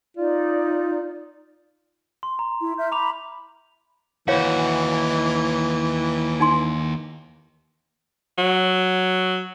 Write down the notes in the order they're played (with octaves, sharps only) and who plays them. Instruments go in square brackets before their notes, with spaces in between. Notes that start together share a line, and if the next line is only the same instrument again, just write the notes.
[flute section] D#4 D5 [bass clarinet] F4
[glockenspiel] C6
A#5
[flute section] E4
E5 F6 G6
[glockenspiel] A#5 D6 F7 [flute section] B5
[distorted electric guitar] D#2 F#4 [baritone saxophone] E3 [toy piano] C#5 F5
[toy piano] D#4 G#5 C6
[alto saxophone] F#3